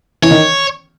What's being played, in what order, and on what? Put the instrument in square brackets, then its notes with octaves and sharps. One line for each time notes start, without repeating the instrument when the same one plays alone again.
[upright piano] E3 [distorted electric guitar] C#5
[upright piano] D#3